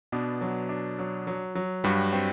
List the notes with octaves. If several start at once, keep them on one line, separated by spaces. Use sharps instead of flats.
B2 B3 D4
F#3
D4
F#3
F#3
F#3
G2 G3 F#4
C4